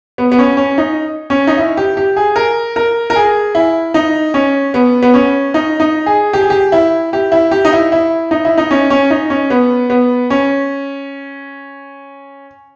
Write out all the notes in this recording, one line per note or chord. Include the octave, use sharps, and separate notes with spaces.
B3
B3
C#4
C#4
D#4
C#4
D#4
E4
G4
G4
G#4
A#4
A#4
A#4
G#4
E4
D#4
C#4
B3
B3
C#4
D#4
D#4
G#4
G4
G#4
G4
E4
G4
E4
G4
D#4
E4
E4
D#4
E4
D#4
C#4
C#4
D#4
C#4
B3
B3
C#4